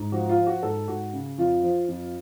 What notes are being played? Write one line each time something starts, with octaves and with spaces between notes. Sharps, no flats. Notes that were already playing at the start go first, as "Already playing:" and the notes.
Already playing: G#2
F3 F#4
F4
F3
F#4
G#2 A4
G#2 F#4
C#3
F2 F4
F3
F2